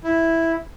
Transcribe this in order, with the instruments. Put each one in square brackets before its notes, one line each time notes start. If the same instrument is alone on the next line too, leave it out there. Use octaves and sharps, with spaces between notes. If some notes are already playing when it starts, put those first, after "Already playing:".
[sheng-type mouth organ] E4